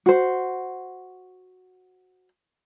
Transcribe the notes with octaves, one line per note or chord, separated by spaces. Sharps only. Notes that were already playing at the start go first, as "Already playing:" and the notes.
F#4 C5